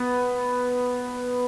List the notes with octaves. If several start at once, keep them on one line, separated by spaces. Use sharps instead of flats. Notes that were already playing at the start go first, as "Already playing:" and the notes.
Already playing: B3